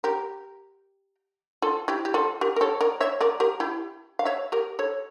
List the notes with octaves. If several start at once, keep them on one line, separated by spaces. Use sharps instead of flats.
G4 A#4
F4 A4
E4 G4
G4
F4 A4
G4 A#4
A#4
A4 C#5
A#4 D5
C#5 E5
A#4 D5
G4 A#4
E4 G4
F5
C#5 E5
G4 A#4
A4 C#5